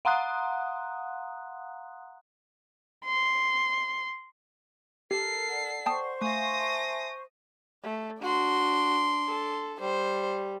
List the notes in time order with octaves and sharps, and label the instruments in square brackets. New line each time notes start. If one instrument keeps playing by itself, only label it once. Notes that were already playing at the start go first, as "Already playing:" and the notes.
[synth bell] F5 F#5 A#5 C6 D#6 F#6
[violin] C6
[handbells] G4 [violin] A4 C7 [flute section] A#4
[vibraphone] D5 F#5
[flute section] C5 C#6 [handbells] G5 A5 D#6
[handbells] A3 [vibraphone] E5 F5 G#5 [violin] D#6 A#6
[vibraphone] E5 G#5 A5
[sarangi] A3
[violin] D4 C6 [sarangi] F#4
[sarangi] A4
[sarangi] G3 [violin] C5